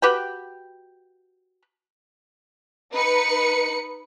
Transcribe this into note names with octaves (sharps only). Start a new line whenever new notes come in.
F#4 G4 B4 G5
D#4 B4 C#7